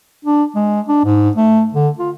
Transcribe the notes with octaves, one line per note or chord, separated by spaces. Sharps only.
D4
G#3
D4
G#2
A3
D3
F4